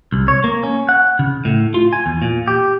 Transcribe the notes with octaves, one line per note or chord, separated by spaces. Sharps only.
C2
C#5
A#3
C#4
F#5
C#3
A2
F4
G#5
E2
A#2
G4